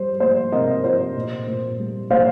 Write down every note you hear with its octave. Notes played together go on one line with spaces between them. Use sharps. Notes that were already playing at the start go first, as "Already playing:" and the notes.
Already playing: G3 C5
A#3 C5
C3 A#4 D#5
F4 C5
A#2
A#2
G3
A#3 C5 F5